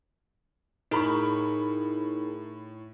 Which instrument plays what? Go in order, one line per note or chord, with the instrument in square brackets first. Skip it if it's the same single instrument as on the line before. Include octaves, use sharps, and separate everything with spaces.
[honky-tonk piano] A2 B5 C#6 [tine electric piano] D#4 G#4 A#4